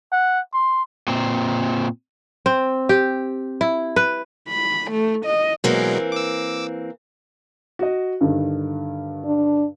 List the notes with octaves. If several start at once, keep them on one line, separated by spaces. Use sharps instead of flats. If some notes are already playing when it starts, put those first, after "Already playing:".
F#5
C6
A#2 C4
C4
G4
E4
B4
B5
A3
D#5
B2 E3 F#3 G#3 A#3 C4
D6 E6
F#4 D#5
G2 D3 D#3
D4